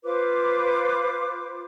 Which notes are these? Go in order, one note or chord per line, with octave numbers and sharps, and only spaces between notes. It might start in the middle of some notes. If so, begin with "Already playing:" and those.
F4 B4 C5 D6